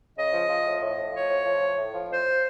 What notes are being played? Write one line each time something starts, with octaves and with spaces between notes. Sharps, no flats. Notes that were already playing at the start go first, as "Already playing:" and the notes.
C#3 D#5
F3
F3
A2
A2
A2
F3 C#5
A2
F3
A2
A2
F3
F2 C5